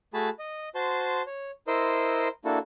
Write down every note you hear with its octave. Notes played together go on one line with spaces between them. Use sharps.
A3 F#4 G#4 A5 B5
D#5
F#4 C5 A5 C6
C#5
E4 A#4 C5 D#5 C6 E6
A#3 D4 E4 F#4 A4